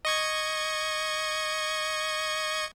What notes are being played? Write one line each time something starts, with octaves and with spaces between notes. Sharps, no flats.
D#5 C#6 G#6